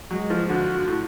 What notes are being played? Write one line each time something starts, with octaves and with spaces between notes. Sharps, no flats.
F#3 G#3
F3
D3 F#4
A2